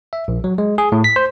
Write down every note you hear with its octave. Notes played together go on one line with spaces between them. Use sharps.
E5
A#1
F#3
G#3
G#4
A2
B6
C5